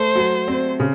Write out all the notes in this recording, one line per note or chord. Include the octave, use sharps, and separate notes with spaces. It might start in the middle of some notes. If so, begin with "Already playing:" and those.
Already playing: A3 C5
F#3
C4
C#3